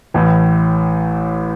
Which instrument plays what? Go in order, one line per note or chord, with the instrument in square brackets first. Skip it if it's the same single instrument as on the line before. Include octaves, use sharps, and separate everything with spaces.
[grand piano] A1 A2 E3